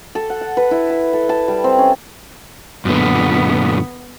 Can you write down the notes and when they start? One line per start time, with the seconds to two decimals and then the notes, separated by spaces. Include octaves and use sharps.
0.15 A4
0.30 F#5
0.41 F#5
0.57 B4
0.71 E4
0.90 A5
1.13 A4
1.29 A5
1.48 G3
1.64 C4
1.78 C#4
2.85 F#2 A#2 D3 B3